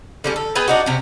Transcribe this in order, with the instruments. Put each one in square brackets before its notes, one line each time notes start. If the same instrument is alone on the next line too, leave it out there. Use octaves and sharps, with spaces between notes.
[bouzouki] D3 G3 C#4
A4
B3 G#4 B4 G5
D4 D#4 F#4
C3 C#4